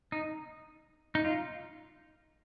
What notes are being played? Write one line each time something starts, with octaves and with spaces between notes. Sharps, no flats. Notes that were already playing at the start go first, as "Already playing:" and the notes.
D#4
D#4
F4